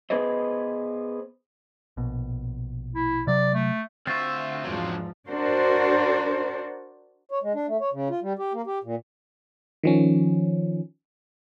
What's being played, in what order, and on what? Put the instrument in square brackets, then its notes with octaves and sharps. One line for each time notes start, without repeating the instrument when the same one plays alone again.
[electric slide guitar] B3 G#4 B4 C5 D#5
[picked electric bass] A#1 B2
[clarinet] E4
[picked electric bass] C3 F#3 [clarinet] D5
[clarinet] A3
[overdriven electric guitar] D2 E5 [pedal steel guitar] C4 F4 [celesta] C#6 A6
[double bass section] E2 G#2 F3 [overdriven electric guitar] F#3 D4
[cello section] D4 F#4 A#4 C5
[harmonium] C#5
G#3
D4
A3
C#5
C#3
F4
G3
G4
A#3
G4
A#2
[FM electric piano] D#3 F3 C#4